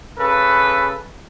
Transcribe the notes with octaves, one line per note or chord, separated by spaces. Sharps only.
C#3 A4 B4